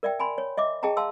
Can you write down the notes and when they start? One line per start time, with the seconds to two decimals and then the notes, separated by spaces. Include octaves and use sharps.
0.03 A#4 D5 E5 G5
0.20 G#5 B5 C6
0.38 C#5
0.57 D#5 E5 D6
0.83 G#4 D#5 G5 A5 A#5
0.97 F5 A5 C6 E6